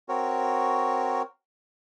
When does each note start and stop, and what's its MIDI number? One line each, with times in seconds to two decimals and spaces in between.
0.09 1.22 60
0.09 1.22 66
0.09 1.22 70
0.09 1.22 73